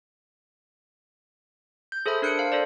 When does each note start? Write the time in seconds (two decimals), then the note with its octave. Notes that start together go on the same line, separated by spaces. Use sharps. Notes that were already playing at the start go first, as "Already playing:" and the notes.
1.92 G6
2.06 G#4 A4 C5 E5 B5 D#6
2.22 D4 A#4 F#6 C#7 D7
2.38 C5 F5
2.52 A4 C5 D5